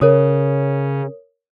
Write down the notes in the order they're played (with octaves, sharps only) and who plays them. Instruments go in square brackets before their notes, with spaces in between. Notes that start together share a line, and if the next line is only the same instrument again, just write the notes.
[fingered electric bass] C#3 [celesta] A#4 C#5 D#6